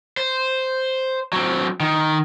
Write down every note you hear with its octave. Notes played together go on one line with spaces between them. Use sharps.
C5
F#3 C4
D#3